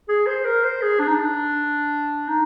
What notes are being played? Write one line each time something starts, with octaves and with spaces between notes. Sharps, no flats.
G#4
C5
A#4
C5
G#4
D4
D#4
D4
D#4